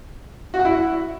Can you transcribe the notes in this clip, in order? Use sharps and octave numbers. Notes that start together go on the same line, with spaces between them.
F#4
F#5
E4